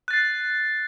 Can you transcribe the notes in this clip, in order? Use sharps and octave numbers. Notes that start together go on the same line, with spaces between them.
F#6 A6 C7